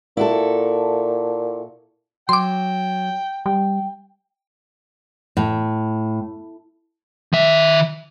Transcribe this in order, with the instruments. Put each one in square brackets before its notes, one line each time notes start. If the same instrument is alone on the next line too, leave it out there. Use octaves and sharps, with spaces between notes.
[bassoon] A#2 [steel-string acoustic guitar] E4 F#4 A4
[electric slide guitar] F#3 [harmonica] G5 [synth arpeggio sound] C6 D6
[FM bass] G3 [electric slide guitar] G5
[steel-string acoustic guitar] A2
[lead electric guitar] D#3 E5